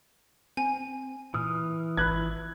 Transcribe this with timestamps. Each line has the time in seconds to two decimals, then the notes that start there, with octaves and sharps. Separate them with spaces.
0.57 C4 G#5
1.34 A#2 E3 D#6 F6
1.97 G#1 B5 F#6 G#6